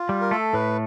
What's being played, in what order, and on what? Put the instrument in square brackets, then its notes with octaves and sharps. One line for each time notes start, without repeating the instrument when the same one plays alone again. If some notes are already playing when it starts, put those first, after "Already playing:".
Already playing: [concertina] F4
[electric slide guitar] G3
[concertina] A#4
[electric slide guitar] A3 [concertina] A4
[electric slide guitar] A2 [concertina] B4